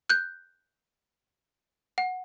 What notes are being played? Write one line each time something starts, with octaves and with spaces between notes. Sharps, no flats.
F#6 G6
F#5